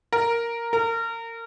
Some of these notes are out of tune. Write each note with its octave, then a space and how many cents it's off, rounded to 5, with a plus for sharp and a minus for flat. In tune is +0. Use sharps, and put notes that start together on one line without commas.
A#4 +0
A#4 -30